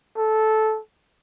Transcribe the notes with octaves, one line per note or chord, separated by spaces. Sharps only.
A4